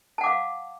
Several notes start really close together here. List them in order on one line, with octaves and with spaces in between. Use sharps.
A5 F#5 D6 F5